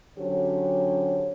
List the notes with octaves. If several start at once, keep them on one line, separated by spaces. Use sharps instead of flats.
D3 F#3 C#4 G4 C5 C#5